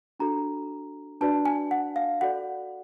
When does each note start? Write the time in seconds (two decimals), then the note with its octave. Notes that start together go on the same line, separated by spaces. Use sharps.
0.20 D4 F#4 A4 A#5
1.21 D4 F#4 B4 D5 A5
1.45 G#5
1.71 F#5
1.96 F5
2.21 F#4 A4 D5 F#5